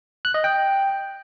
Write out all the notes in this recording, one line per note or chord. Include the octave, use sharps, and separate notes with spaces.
F#6
D#5
G5